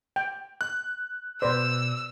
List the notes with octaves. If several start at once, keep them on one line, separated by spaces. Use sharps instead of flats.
G5
F#6
B2 B4 C5 D5 E6